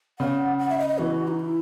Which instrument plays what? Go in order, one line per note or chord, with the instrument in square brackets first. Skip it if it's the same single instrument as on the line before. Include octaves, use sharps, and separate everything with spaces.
[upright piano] C#3 [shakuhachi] F#5
[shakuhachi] F#5
E5
D#5
D#5
[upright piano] E3 [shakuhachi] F#4
[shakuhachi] D#4
E4